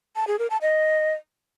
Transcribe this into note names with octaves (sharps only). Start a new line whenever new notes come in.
A5
G#4
A#4
A5
D#5